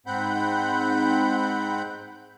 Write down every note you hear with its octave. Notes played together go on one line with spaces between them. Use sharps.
G#2 C4 F#5 B5 G6